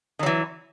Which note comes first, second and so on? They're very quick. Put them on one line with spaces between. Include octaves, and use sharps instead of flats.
D#3 F#3 E3